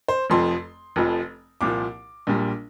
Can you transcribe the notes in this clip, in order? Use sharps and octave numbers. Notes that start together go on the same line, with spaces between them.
C5
F1 F2 F3 C6
F1 F2 F3
C2 A#2 F3 D6
A#1 A#2 G3